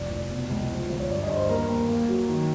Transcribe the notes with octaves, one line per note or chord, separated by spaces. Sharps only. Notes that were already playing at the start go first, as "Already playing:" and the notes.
Already playing: F1 D5
F1
B2
C#2
F3
D2
C#5
G2 D5
D#5
G2
C5
D#2 A#4
D#2
A#3
F#3
D#3